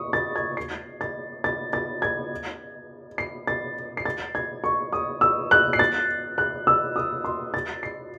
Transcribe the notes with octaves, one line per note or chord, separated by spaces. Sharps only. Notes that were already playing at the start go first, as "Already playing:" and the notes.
Already playing: C#6 D#6
A6
G#6
C7
A6
A6
A6
G#6
C7
A6
C7
A6
G#6
C#6
D#6
E6
F#6
C7
A6
F#6
E6
D#6
C6
A6
C7